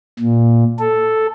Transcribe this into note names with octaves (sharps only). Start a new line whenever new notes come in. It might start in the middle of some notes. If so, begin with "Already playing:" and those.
A#2
A4